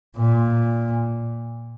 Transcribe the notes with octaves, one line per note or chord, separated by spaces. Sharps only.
A#2